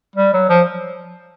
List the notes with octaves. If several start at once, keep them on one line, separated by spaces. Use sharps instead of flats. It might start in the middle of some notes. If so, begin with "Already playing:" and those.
G3
F#3
F3